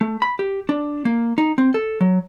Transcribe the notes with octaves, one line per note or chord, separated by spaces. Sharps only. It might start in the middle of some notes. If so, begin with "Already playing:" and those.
A3
B5
G4
D4
A#3
D#4
C4
A4
F#3